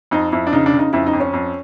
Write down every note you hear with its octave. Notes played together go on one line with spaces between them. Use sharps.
F2 D#4
F2 E4
D4
C#3 D#4
D4
C#3
D#4
F2 E4
D#4
F2
C#4
F2